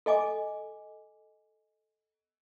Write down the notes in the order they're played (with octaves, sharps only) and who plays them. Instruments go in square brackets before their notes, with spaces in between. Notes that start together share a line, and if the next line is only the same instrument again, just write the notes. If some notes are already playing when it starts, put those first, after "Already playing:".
[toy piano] A4 D#5 G#5 D6